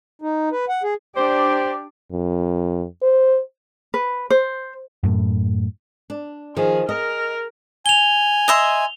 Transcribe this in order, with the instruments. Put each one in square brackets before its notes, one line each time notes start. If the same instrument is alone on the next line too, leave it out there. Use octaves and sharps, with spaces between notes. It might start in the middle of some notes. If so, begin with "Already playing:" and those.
[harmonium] D#4
B4
F#5
G#4
[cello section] D4 D5 [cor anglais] G4 [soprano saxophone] C5
[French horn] F2
C5
[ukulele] B4
C5
[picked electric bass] F#2 A2
[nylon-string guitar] D4
[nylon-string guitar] D#3 F3 [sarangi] G#4
[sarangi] A#4 [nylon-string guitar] D#5
[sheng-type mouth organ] G#5 [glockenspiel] F7 G7
[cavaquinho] D#5 E5 C6